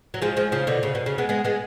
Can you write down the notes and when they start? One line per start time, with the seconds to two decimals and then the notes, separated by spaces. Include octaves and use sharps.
0.14 F#3
0.22 F3 G#3
0.37 F3 G#3
0.52 C#3 F3
0.67 B2 D3
0.83 C#3
0.95 B2
1.06 C#3
1.18 G#3 B3
1.29 G#3 B3
1.45 G#3 B3